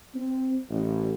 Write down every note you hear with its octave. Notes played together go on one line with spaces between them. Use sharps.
C4
A1